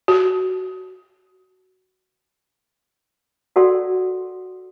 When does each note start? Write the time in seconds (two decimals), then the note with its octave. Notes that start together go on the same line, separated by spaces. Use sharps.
0.08 F#4
3.56 F#4 A4 A#4 D5 F#5 C6